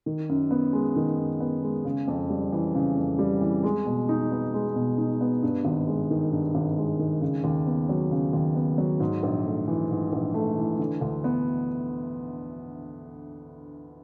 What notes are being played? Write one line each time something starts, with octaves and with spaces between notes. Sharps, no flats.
D#3
F#2
B3
G#3
D#3
F#2
B3
G#3
C#3
F2
G3
E3
C#3
F2
G3
E3
G#3
B2
D#4
B3
G#3
B2
D#4
B3
G2
G#1
G#3
D#3
G2
G#1
G#3
D#3
C#3
D#2
B3
F#3
C#3
D#2
B3
F#3
G#2
A#1
A3
E3
G#2
A#1
A3
E3
D3
D2
B3